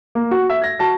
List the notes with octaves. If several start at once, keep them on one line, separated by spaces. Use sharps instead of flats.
A#3
F#4
E5
G#6 A#6
F#4 A5 A#6